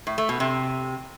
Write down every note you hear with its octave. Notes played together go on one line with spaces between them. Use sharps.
A2
A3
B2
C3